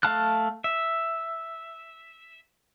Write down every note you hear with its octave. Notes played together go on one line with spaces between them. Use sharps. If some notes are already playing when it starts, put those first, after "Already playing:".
A3 F5 A5 F6 F#6
E5